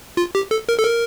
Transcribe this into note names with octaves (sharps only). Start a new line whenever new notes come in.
F4
G4
A4
A#4
A4
A#4